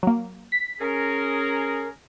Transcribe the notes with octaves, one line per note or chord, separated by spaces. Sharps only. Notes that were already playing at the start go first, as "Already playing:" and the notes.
F#3 A#3
B6
C#4 G#4 A#4